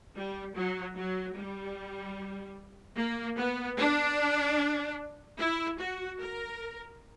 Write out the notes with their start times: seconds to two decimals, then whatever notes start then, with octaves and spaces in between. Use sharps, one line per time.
0.16 G3
0.56 F#3
0.97 F#3
1.36 G3
2.97 A#3
3.38 B3
3.79 D4
5.40 E4
5.80 F#4
6.20 A#4